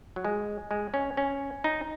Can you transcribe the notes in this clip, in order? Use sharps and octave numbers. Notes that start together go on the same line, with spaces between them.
F#3
G#3
G#3
C#4
C#4
D#4